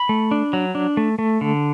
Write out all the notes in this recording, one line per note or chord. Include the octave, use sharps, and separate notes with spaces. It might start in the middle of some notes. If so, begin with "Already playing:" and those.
Already playing: B5
A3
D4
F#3
D4
A3
A3
D3